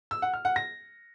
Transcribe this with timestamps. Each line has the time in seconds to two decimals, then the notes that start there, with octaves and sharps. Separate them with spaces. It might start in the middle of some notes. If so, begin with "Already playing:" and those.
0.11 E6
0.22 F#5
0.34 F6
0.45 F#5
0.56 A#6